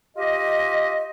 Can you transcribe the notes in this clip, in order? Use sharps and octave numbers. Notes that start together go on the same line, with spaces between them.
F4 G4 D#5